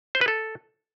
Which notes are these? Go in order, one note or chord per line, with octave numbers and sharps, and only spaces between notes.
C5
B4
A4